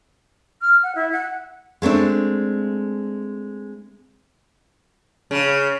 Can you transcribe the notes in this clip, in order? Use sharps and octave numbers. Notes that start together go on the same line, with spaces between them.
F6
F#5
E4
F#5
G#3 A3 C4 D4
C#3